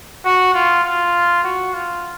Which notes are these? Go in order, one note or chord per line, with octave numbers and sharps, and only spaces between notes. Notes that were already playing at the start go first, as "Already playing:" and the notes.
F#4
F4
F4
F#4
F4